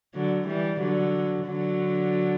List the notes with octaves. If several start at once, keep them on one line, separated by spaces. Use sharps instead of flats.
D3 F#3
E3 G3
D3 F#3
D3 F#3